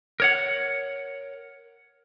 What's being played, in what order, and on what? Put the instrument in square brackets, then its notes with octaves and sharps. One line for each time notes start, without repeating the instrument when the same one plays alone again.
[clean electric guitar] A#4 C#5 F#5